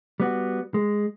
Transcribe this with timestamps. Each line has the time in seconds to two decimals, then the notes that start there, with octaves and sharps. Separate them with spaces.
0.20 G3 B3 F#4
0.74 G#3